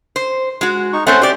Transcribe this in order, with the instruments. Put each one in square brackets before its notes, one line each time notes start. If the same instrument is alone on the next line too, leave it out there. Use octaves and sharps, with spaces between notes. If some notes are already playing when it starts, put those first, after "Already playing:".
[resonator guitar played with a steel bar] C5
G#3 F#4
[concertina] D#4 C#6
[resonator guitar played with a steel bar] A3 C4 A4 [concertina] C#4 C5 F#5
[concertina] G4 [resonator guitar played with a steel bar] C5 D5